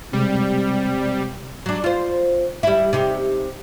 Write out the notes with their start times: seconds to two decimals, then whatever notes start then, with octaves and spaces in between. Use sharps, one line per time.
0.13 C3 G3 G#3 C4
1.66 F#3 D4
1.84 F4 C5
2.63 G3 E4
2.93 C3 D#4 G4